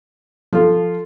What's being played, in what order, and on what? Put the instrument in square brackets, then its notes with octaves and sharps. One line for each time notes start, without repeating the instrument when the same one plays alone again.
[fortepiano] F3 F4 [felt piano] A4